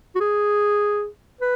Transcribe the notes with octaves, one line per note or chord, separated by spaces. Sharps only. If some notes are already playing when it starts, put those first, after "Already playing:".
F#4
G#4
B4